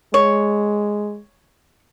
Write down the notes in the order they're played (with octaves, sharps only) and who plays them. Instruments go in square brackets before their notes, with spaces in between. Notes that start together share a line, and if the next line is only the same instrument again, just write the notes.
[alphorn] G#3 [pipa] C#5